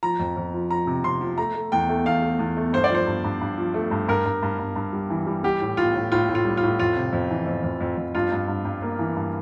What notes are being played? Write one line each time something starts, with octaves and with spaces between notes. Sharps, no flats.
F3 A#5
F2
F2
F3
F3 A#5
C3
C3 C6
F3
A3 A#5
A3
E2 G5
A3
E2 F5
A3
E2
A3
G2 C5
D5
F3 C5
G2
G2
G2
F3
A3
G2
G2 A#4
G2
G2
G2
G2
G3
E3
G3
G3 G4
A2
A2 F4
A2
A2 F4
A2
F4
G3
F4
A2
F2 F4
C3
F2
E3
F2
F2
F2
F2
G2 F4
G2
G2
G2
A#3
E3
G2